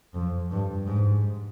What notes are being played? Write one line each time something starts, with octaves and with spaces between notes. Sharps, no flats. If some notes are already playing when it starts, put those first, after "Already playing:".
F2
G2
G#2